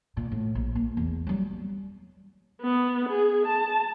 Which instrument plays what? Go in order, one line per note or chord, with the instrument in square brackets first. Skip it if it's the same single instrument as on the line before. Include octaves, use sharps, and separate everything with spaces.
[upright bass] A#2
A2
A#1
A#3
E2
F#3 G3
[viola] B3
G#4
A5